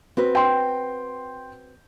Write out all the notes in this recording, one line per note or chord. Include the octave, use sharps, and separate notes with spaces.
C4 F#4 B4
G5 C6